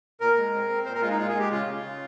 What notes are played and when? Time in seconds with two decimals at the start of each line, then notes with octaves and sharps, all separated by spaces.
0.20 A#2 A#4
0.37 G#3
0.54 C4
0.69 C4
0.85 A#2 C5
0.94 A#4
1.01 G#3 F4
1.10 D#4
1.17 A#2 F4
1.29 G#4
1.34 G#3 G4
1.50 C#3 F4
1.67 C#3
1.83 C#3